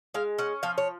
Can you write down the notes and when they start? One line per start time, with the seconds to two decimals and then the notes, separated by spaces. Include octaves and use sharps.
0.14 G#3 F5
0.38 C#4 F#5
0.63 F3 F5
0.78 C#5